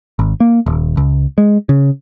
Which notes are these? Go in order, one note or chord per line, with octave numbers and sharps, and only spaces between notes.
G#1
A#3
D#1
C#2
G#3
C#3